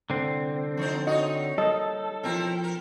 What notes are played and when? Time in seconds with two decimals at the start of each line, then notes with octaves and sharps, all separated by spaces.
0.10 C2 D3 C4
0.77 F3 D#4 C5
1.07 D#4 F#4 C#5 D#5
1.58 G3 A#3 A4 D#5
2.23 B2 F3 C4 E4 A#4
2.63 A#4